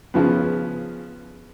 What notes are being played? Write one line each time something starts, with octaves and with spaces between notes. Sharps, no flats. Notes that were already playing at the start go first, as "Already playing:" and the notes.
C#3 F3 B3